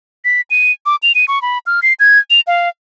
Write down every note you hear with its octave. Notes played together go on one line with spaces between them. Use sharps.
B6
D#7
D6
F7
D#7
C#6
B5
F6
C7
G#6
F7
F5